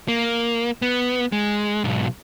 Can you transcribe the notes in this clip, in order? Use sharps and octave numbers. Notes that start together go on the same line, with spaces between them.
A#3
B3
G#3
B1 G#2